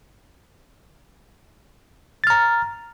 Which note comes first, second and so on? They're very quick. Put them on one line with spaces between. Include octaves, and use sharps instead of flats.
A6 F6 A#5